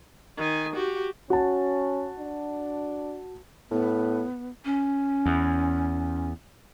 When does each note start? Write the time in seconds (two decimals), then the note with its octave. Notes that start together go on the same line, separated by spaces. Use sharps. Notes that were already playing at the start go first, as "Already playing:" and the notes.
0.37 D#3 G#5
0.74 F#4 G4
1.30 C#4 F#4 A5
2.19 D4
3.71 A2 B3
4.65 C#4
5.26 E2